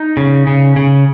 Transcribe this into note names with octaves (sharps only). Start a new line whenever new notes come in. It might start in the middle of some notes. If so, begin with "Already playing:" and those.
Already playing: D#4
C#3
C#3
C#3